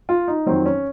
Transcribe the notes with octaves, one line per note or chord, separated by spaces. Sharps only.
F4
D#4
F2 D#3 F#3 C4
C#4